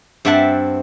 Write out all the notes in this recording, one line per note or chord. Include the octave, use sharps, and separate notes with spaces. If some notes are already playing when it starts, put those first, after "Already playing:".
G2 C4 E5 F#5 A5